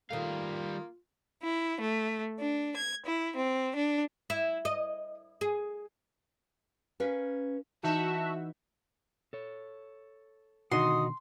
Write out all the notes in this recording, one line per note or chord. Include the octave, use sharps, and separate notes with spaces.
D#3 G3 A3 A#3 F4 F5
E4
A3
D4
G#6
E4
C4
D4
E4
D#5
G#4
C#4 A#4 B4 F5
E3 D#4 F#4 E5 A5 G6
A4 C#5
B2 D3 D#3 D#4 F#4 C6 D#6